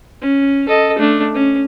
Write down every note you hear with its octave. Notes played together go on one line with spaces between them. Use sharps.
C#4
A4 D#5
A3 D4
C#4